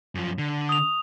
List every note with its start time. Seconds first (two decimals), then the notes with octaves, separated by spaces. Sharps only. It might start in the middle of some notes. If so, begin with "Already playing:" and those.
0.15 F#2 F3
0.38 D3
0.69 D#6 F7